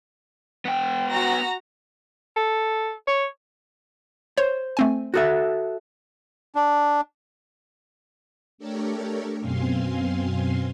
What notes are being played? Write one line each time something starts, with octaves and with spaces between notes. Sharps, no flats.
B3 G5
F#4 A#5 A#6
A4
C#5
C5 C#5
A3 C4 G#5
F#4 A4 E5
D4
A3 D4 G4 A4 A#4 C#5
F#2 B2 C4 F5 G#5 C6